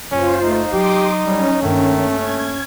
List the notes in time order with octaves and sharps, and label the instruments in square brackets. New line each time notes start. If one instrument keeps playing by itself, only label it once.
[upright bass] F#1 [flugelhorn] C#4 [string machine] F4 C5
[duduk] A3 [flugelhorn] D#4
[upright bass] F#3 [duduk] G4 [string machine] C6 D6 D#6
[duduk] G3 [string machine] C#4
[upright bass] G2 A#3 [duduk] D#3 [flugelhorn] A3
[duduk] C#4 [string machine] G#6